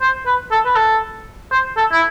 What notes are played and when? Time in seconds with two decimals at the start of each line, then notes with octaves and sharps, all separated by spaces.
0.01 C5
0.26 B4
0.51 A4
0.65 B4
0.75 A4
1.51 C5
1.76 A4
1.92 E4